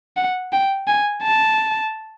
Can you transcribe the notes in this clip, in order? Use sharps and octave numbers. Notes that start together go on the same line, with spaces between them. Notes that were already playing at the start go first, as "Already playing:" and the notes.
F#5
G5
G#5
A5